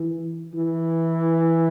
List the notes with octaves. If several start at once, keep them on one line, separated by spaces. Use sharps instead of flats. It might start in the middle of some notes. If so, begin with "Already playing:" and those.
Already playing: E3
E3